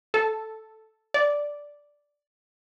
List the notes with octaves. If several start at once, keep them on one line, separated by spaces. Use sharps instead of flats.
A4
D5